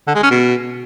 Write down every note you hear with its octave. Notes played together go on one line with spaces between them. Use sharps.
D3
G#3
C#4
B2